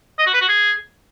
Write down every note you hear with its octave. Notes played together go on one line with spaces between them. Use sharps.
D#5
F#4
B4
F#4
G#4